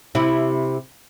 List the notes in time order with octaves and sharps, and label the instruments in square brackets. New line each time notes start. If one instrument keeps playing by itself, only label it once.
[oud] C3 E4